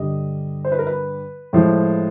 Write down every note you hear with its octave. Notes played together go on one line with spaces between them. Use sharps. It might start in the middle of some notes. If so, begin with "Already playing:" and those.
Already playing: G2 D3 G3 D#5
C5
B4
A#4
B4
A2 F3 G#3